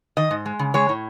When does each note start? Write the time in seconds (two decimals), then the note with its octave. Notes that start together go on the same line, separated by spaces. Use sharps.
0.17 D#3 D#5
0.31 G#2
0.46 G#3
0.59 C#3
0.74 G#3 C#5
0.89 A2